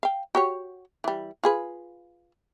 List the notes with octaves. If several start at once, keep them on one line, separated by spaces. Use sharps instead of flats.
F5 G5
F#4 G4 C#5
E3 G3
F4 G#4 B4